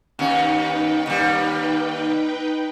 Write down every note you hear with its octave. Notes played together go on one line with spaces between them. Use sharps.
D#2 C#4 D#4 B4 G5
D#2 G3